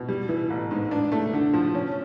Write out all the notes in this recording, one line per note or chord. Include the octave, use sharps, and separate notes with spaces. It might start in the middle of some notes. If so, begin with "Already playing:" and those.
Already playing: B2
G3
E3
A1
G#2
D4
A3
D3
F3
C#4